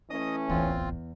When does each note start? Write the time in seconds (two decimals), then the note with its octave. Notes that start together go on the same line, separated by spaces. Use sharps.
0.10 E3 A3 C#4 D#5 D#6
0.50 D1 A1 E2 C4 F4